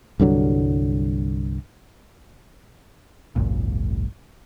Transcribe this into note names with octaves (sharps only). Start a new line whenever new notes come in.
C2 G2 D3 F#3
G#1 C#2 F#2 A#2